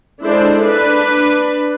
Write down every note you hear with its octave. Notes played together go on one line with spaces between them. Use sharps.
G#3 D4 E4 A4 C5 D5
D4 B4